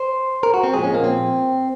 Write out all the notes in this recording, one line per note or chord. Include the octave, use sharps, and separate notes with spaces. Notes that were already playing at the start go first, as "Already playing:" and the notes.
Already playing: C5
A#4
F#4
C4
A#2 F3 G#3 G#4
C#4
A#3
C4